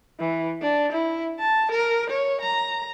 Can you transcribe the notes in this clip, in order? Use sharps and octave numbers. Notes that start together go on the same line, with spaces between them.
E3
D4
E4
A5
A#4
C#5
A#5